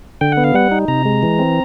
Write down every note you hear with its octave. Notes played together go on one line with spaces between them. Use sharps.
D3 G5
F#5
B3
F5
G3 F#5
D#4
C3 A#5
G#3
E3
C4